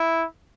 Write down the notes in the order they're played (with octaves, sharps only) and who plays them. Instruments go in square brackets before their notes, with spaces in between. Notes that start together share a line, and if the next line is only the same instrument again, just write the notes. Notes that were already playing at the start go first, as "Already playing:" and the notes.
Already playing: [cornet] E4